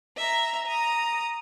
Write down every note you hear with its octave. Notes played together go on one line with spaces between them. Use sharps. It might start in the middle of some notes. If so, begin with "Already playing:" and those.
E5 A#5
A#5 D#6